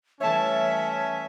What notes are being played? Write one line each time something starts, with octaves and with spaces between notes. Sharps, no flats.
E3 G3 A3 C#4 C#5 E5 A5